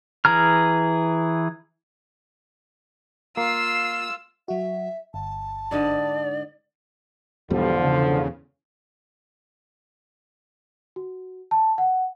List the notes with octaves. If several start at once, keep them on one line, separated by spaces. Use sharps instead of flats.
E3 G#4 A#5 F6
A#3 F4 E6 C7
F#3 F#4 E5
G1 A5
G#2 D3 D5 D#5
E2 G#2 B2 D3 F3 G3
C#3
F#4
A5
F#5